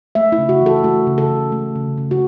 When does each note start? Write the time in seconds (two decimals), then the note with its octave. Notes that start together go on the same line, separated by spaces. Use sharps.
0.15 A3 E5
0.32 E4
0.38 C#3
0.49 F#4
0.62 E3 A4
0.83 A3 F#4
1.07 C#3
1.18 A4
1.29 E3
1.52 A3
1.76 C#3
1.98 C#3
2.11 F#4